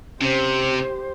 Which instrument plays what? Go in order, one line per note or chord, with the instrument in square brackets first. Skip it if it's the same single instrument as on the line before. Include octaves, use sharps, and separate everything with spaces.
[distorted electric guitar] C3 [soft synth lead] C#4 [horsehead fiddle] G4 C5